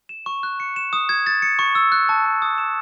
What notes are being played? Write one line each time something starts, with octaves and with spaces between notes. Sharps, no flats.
E7
C#6
F#6
C#7
E7
D#6
G#6
A6
C#7
C#6
E6
F#6
A5
A5
D#6
E7